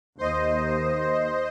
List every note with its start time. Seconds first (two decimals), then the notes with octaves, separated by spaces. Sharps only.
0.18 D#2 C5 D#5